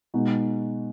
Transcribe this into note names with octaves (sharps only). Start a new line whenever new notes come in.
B2 G#3 D#4 F#4